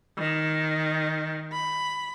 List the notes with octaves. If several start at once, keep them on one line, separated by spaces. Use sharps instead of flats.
D#3
B5